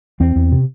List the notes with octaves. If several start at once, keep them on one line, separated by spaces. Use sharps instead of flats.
E2 C4
E2
C3